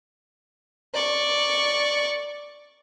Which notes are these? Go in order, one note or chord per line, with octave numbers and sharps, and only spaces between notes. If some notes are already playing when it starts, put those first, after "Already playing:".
D5 C#6